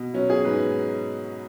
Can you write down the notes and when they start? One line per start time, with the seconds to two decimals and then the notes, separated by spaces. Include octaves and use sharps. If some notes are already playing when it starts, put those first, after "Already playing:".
Already playing: B2
0.14 F#3 C#4
0.30 G#4
0.45 G#2 B4